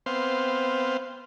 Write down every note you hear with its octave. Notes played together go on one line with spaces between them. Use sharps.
B3 C4 C5 F5